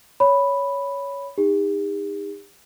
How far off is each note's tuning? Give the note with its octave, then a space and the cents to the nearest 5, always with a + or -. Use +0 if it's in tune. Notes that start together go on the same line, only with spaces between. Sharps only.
C#5 +15 B5 +0
D#4 +0 G4 +45